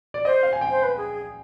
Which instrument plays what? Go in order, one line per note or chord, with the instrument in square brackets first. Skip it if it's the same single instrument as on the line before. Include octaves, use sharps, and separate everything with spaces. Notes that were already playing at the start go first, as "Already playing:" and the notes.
[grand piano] D5
[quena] C5 [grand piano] D#5
[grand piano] F5
G#5
G5
[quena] C5
B4
G#4